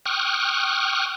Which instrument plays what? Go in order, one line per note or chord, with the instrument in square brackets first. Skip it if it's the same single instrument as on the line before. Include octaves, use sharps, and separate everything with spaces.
[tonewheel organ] G5 C#6 D#6 F6 F#6